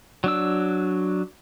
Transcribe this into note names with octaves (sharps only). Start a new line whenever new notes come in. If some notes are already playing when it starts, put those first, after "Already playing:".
F#3 D4 E6